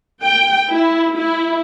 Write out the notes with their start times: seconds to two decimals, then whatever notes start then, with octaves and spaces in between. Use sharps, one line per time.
0.23 G5
0.71 E4
1.15 E4